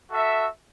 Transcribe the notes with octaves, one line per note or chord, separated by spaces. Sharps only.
F#4 A4 E5